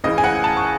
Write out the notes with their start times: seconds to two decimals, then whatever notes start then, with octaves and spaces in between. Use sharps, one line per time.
0.04 C#2 C#3 E3 D#5
0.18 G#5
0.24 F#5
0.44 A5
0.57 C#6